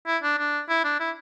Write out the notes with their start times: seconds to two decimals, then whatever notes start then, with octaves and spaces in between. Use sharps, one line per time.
0.07 E4
0.23 D4
0.38 D4
0.69 E4
0.84 D4
0.99 E4